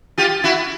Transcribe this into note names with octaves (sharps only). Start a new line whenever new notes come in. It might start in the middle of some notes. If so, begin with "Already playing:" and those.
F4 G4
E4 F#4